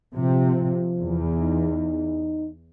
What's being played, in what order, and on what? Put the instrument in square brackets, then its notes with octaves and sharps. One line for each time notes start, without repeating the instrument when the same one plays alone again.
[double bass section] C3 [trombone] F3
[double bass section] E2
[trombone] D#4